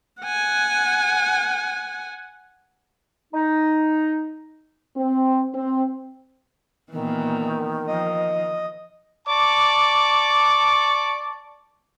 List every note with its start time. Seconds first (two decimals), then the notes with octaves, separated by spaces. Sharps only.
0.21 F#5 G#5
3.33 D#4
4.97 C4
5.55 C4
6.92 A#2 D#3 E3 B3
7.87 F3 D#5
9.28 D5 A5 C#6 D6